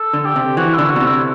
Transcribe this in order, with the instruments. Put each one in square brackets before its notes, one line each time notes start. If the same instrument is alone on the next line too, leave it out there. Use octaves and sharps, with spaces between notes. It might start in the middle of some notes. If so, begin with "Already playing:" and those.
Already playing: [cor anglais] A4
[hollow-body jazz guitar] D3
[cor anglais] G4
[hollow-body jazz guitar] C3
[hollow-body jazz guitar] E3 [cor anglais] F#4
[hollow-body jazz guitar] D3 [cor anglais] E4
[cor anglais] F#4
[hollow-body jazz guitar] B2
C3
[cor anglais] E4